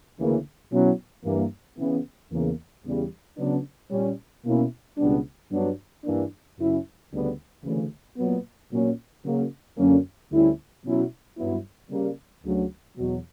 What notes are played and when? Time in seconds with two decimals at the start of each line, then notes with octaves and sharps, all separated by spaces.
0.18 D2 C#3 E3 A#3
0.71 B2 F#3 C#4 E4
1.25 G2 E3 A#3
1.78 C#3 E3 B3
2.31 E2 C#3 E3 A#3
2.85 E2 C#3 G3
3.38 C#3 F#3 B3 D4
3.91 A#2 G3 C#4
4.44 B2 A#3 C#4 E4
4.98 C#2 B2 G3 B3 D4
5.51 G2 F#3 B3 D4
6.04 G2 E3 A#3 D4
6.58 F#2 C#3 F#3 C#4 E4
7.11 D2 C#3 G3 B3 D4
7.64 D2 C#3 E3
8.18 A#2 F#3 B3
8.71 A#2 F#3 C#4
9.24 C#3 F#3 A#3
9.77 F#2 D3 A#3 C#4
10.31 D2 D3 G3 C#4 E4
10.84 B2 F#3 C#4 E4
11.37 G2 F#3 B3 E4
11.91 C#3 G3 A#3
12.44 D2 C#3 F#3
12.97 E2 B2 F#3